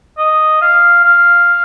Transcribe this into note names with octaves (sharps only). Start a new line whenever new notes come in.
D#5
F5
F5